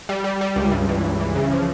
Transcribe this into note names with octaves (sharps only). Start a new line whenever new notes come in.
G3
G3
G3
C#2
G2
E3
G2
E3
C#3
F3